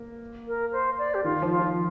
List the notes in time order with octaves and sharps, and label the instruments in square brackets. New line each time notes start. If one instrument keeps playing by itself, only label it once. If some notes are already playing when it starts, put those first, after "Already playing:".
Already playing: [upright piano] A#3
[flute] A#4
C5
D5
G4
[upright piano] D#3 [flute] F4
[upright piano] F3
[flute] F4
[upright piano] F3